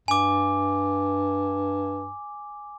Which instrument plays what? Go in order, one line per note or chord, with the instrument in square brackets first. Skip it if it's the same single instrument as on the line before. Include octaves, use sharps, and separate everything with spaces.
[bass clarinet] G2 [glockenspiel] G#5 D6